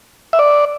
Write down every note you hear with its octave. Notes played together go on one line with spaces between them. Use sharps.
E5
D5